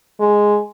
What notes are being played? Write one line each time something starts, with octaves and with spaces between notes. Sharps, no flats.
G#3